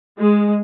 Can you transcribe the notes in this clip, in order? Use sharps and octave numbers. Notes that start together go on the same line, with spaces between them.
G#3